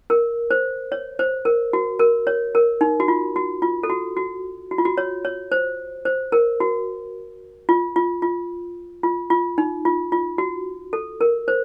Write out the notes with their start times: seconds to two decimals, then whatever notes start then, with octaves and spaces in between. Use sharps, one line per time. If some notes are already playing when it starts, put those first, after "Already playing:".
0.10 A#4
0.51 C5
0.92 C#5
1.19 C5
1.45 A#4
1.73 F#4
1.99 A#4
2.27 C#5
2.55 A#4
2.81 D#4
3.00 F#4
3.08 F4
3.36 F#4
3.62 F4
3.83 A4
3.90 F#4
4.17 F#4
4.71 F#4
4.78 F4
4.85 F#4
4.98 C#5
5.25 C#5
5.52 C5
6.05 C5
6.32 A#4
6.60 F#4
7.69 F4
7.96 F4
8.22 F4
9.03 F4
9.30 F4
9.58 D#4
9.85 F4
10.12 F4
10.38 F#4
10.93 A4
11.21 A#4
11.48 C5